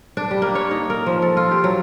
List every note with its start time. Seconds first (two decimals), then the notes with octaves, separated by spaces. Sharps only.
0.17 D4
0.31 G3
0.42 A#3
0.55 C#5
0.71 D#4
0.90 A#4
1.06 F3
1.22 A4
1.37 F4
1.51 G4
1.64 F#3